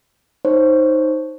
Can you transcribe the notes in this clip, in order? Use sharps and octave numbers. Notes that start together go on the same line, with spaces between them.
D#4 C5 C#5